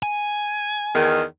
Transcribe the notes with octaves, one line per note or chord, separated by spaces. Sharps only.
G#5
E2 D#3